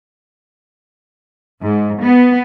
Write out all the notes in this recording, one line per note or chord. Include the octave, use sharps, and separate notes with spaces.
G#2
B3